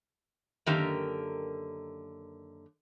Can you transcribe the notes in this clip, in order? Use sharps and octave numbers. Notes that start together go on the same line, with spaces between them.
F#2 D3 D#3 A#3 G4 A#4